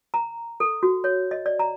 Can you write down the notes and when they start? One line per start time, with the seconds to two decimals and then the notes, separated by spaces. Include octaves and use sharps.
0.14 A#5
0.60 A4
0.83 F#4
1.04 C#5
1.31 D#5
1.46 D5
1.59 A#5